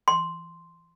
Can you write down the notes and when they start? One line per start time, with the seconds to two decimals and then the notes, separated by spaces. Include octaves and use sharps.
0.08 C6